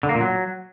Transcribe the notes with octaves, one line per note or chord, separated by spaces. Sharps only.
D3
A#3
A#2
F#3